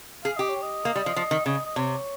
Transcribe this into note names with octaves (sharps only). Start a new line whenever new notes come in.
G#4 F5
G4 D#5
C#5
D#5
A#3
G3
F3
F3
D#3
C#3 D#5
D#5
C3 C#5